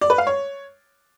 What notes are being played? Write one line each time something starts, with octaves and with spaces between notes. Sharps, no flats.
D5
B4
F5
C#5